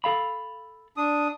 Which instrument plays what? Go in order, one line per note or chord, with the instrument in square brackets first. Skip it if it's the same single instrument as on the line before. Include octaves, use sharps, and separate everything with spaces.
[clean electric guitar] A4 F5 B5
[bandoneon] D4 D#6